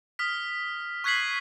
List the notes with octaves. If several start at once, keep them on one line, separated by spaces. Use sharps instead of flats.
D#6 F6 B6
C#6 F#6 G#6 B6 C7 F#7